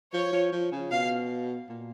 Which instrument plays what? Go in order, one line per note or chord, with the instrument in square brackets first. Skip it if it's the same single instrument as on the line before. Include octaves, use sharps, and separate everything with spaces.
[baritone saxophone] F3 [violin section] C#5
[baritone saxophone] F3
F3
C#3
[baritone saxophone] B2 [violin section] F5
[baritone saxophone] A#2